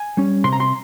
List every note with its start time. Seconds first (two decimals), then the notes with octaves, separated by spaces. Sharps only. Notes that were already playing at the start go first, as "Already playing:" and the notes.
Already playing: G#5
0.17 G3 C#4
0.44 C3 C6
0.53 A#5
0.60 C6